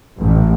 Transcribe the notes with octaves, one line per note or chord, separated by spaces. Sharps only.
A1